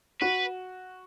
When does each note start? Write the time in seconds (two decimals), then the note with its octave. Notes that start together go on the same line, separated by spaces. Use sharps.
0.22 F#4 B4